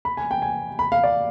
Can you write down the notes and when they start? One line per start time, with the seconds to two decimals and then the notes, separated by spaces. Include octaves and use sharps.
0.05 B5
0.17 G#5
0.31 G5
0.42 G#5
0.79 B5
0.92 F5
1.04 D5